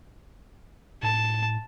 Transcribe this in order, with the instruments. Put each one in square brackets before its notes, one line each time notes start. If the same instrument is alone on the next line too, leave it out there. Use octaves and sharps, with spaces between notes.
[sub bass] A2 [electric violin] A5